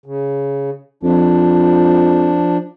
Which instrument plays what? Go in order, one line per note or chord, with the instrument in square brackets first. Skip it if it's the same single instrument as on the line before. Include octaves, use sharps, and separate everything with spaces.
[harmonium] C#3
[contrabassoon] F2 [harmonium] F3 D4